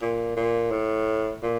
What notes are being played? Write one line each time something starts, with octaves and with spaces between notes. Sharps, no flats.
A#2
A#2
A2
A#2